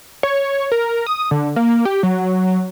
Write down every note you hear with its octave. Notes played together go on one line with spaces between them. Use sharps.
C#5
A#4
D#6
D3
A#3
G4
F#3